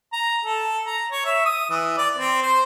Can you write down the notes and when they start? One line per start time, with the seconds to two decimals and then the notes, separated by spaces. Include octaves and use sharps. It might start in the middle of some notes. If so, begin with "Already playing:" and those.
0.12 A#5
0.44 A4
0.86 A#5
1.11 C#5
1.25 E5
1.45 D#6
1.70 E3
1.98 D5
2.16 C4
2.42 C5